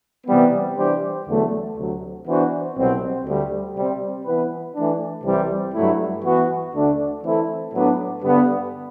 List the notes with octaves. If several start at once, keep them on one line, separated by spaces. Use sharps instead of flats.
C3 E3 G3 B3
E3 G3 D4 G4 C5
E2 D3 F#3 A3
D2 C3 F#3
E3 B3 D4 F#4 C5
C2 B2 F#3 C4
D2 D3 G3
C3 G3 C4
E3 B3 E4 B4
E3 A3 D4
C2 C3 E3 G3 C4
G2 F#3 A3 E4
E3 B3 F#4
D2 D3 A3 D4
E3 A3 C4 E4 A4
A2 F#3 B3 D4
G2 D3 G3 B3